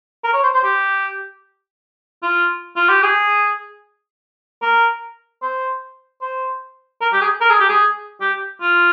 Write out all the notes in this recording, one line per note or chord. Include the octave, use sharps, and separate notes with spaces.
A#4
C#5
C5
C5
G4
F4
F4
G4
G#4
A#4
C5
C5
A#4
G4
G#4
A#4
G#4
G4
G#4
G4
F4